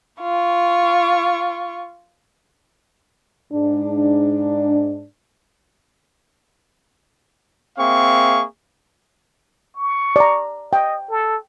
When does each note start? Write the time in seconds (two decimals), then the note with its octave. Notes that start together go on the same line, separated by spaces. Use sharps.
0.21 F4 C#6
3.52 G#2 D4
7.77 A#3 C4 G#4 E5 F5 C#6
9.76 C#6
10.16 D5 A#5
10.73 D#5 G5
11.10 A4